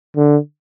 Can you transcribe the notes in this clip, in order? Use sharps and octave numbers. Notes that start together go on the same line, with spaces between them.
D3